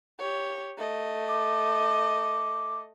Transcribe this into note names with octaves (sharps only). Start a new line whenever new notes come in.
G4 C#5
A3 D#5
D6